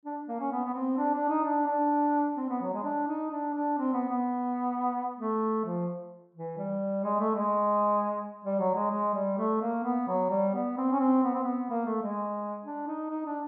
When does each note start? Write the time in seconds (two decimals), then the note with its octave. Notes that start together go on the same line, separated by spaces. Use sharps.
0.05 D4
0.28 A#3
0.40 C#4
0.51 B3
0.65 B3
0.74 C4
0.97 D4
1.14 D4
1.29 D#4
1.44 D4
1.67 D4
2.37 C4
2.49 B3
2.61 F#3
2.73 G#3
2.84 D4
3.07 D#4
3.30 D4
3.54 D4
3.78 C4
3.93 B3
4.09 B3
5.18 A3
5.64 F3
6.34 E3
6.57 G3
7.04 G#3
7.19 A3
7.35 G#3
8.44 G3
8.59 F#3
8.75 G#3
8.90 G#3
9.14 G3
9.37 A3
9.61 A#3
9.83 B3
10.08 F#3
10.30 G3
10.53 B3
10.77 C4
10.92 C#4
11.00 C4
11.23 B3
11.34 C4
11.43 B3
11.70 A#3
11.85 A3
12.02 G#3
12.64 D4
12.87 D#4
13.10 D#4
13.25 D4